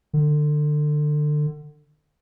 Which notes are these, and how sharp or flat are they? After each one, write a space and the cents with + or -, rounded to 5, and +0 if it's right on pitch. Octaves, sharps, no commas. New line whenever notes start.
D3 +25